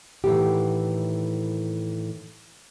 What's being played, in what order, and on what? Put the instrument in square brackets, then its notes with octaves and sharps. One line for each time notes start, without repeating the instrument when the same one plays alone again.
[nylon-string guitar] A2 D#3 E3 A3 B3 G4